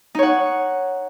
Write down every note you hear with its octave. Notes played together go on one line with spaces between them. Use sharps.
D#4 C#5 F#5